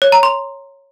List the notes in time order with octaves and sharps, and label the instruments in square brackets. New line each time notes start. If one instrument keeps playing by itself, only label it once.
[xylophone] C#5
A#5
C6